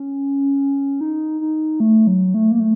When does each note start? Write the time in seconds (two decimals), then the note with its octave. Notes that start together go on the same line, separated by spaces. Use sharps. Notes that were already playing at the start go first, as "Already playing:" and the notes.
Already playing: C#4
1.01 D#4
1.41 D#4
1.80 A3
2.07 F#3
2.34 A3
2.51 A#3
2.60 A3